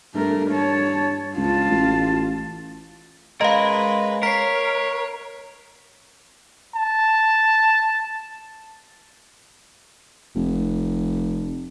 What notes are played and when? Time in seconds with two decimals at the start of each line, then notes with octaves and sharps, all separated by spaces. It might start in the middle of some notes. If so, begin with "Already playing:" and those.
0.15 G2 A3 A#4
0.51 C#5 A5
1.37 C#2 F4 A5
1.70 A1
3.41 G#3 C#4 A#4 B4 D#5 F5
4.23 A#4 C#5 B6 C7
6.75 A5
10.35 F1